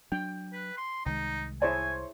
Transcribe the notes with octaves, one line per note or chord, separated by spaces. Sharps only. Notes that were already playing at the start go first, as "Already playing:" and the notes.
F#3 D4 G5
B4
C6
C2 D#3 G#3 D#4
E4 G#4 C5 C#5 G#5 A5